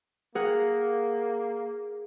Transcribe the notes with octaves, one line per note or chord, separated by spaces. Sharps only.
A#3 G#4 A#4 F#5